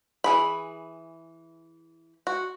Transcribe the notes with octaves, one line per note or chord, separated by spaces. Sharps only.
E3 G#4 B5
F#4